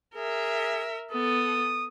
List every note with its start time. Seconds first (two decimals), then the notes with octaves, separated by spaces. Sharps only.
0.16 G#4 A#4 E5
1.12 B3 A4 D#6